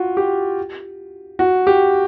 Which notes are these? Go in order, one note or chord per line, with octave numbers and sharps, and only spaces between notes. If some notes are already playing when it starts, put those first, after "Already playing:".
Already playing: F4 F#4
G4
F#4
G4